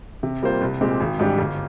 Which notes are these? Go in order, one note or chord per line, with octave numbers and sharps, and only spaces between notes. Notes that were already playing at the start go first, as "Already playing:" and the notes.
C3
G3 A#3 F4 C5
C2
A#2 G#3 C4 G4
G#1
G#2 G3 D4 G4
G1